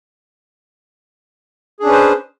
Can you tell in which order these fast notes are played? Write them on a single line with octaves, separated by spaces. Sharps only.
G#4 D4 C#4 B4 C5